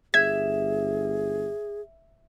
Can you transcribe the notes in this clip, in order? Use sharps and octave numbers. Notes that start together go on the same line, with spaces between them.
G1 G#4 E5 G#6